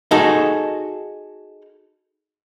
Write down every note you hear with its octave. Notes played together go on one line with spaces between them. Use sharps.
D#4 F#4 G#4 A4